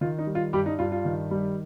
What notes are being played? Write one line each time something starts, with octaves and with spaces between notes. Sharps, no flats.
D#3 F4
D#4
G3
F4
G2 G3 G4
D#4
G2 F4
F4
D#3
G3